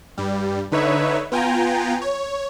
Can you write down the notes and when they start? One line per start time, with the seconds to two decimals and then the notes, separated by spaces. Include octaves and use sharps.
0.18 G2 G3
0.72 D3 D#4 B4 C#5 E5
1.32 B3 F4 G5 G#5 A#5
2.01 C#5